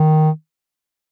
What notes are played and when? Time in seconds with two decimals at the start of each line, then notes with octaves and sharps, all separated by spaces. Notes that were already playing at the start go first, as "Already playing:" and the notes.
Already playing: D#3